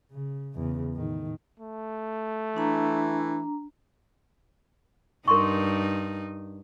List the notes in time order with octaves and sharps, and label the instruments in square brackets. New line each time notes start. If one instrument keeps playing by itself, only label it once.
[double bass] C#3
E2 C#3
A2 D#3
[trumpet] A3
[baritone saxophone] E3 [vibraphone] D4 A#5
[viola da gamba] G2 D#4 [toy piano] A#4 C6 C#6